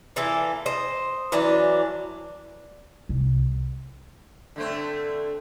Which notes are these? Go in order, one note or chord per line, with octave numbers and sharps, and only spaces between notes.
A#2 E3 A#3 A4
C5 D#5
E3 F#3 C#4 D4
C2
D3 A3 C4